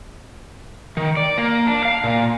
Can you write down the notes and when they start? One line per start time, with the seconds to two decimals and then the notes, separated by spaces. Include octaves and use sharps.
0.97 D#3
1.17 D5
1.38 A#3
1.67 D4
1.85 F5
2.04 A#2